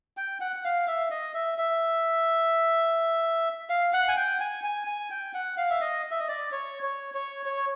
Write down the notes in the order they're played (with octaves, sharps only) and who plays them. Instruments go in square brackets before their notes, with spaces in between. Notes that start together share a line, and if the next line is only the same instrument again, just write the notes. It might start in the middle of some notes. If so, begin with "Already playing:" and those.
[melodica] G5
F#5
F#5
F5
E5
D#5
E5
E5
F5
F#5
G#5
G5
G#5
G#5
G#5
G5
F#5
F5
E5
D#5
E5
D#5
D5
C#5
C#5
C#5
C#5